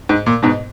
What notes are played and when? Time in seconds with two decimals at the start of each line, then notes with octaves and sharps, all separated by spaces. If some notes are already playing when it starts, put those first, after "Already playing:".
0.09 G#2
0.26 A#2
0.43 G#2 B2